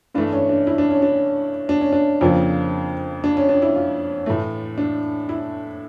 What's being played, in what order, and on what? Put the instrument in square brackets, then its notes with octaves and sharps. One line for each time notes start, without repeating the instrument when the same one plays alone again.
[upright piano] G2 E3 A3 D4
C#4
D4
E4
D4
C#4
D4
D4
C#4
D4
F2 C#3 F3 A#3
D4
C#4
D4
E4
F4
A2 E3 A3
D4
E4